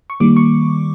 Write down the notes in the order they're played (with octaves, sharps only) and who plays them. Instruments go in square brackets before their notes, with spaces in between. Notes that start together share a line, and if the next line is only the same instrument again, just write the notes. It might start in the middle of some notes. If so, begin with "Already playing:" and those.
[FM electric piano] C#6
D#3 G3 A#3 D6
C#6